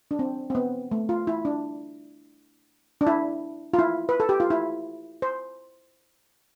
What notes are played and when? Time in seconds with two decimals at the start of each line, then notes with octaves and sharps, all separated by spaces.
0.11 D4
0.19 C4
0.50 C4
0.55 B3
0.92 A3
1.09 F4
1.27 E4
1.45 D4
3.01 D4
3.07 E4
3.73 F4
3.79 E4
4.09 B4
4.20 A4
4.29 G4
4.40 F4
4.50 E4
5.22 C5